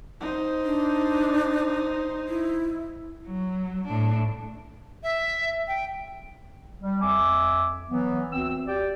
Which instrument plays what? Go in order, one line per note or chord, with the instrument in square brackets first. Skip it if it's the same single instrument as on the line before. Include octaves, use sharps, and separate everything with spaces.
[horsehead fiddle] D#4 C5
[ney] D4
E4
[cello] F#3
A2 D4
[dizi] E5
G5
[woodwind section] G3
F2 E5 G#5 D6
E3 F#3 B3
D2 C4 E6
G4 D5 G5